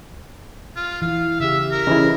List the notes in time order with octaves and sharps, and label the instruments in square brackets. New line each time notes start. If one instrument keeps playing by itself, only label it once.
[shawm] F4
[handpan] E3 [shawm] F5
[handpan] C#3 G4 [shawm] E5
[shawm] A#4
[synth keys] C#3 E3 E4 [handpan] D#5